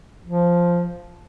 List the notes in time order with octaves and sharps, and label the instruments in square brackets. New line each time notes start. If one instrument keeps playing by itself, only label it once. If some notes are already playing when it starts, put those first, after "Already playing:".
[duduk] F3